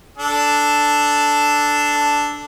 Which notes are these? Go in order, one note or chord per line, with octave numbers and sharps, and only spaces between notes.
D4 A4